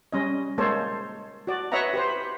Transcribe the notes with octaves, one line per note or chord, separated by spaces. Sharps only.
G3 C#4 D#5
G#3 A#3 A4 C5 C#5 A5
F#4 D5
B4 C#5 D#5 E5 F#5 A#5
G4 B4 C5
B5